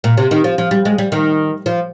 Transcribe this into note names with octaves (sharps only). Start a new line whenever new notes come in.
A#2
C3
D#3
F3
F3
G3
G#3
G3
D#3
F3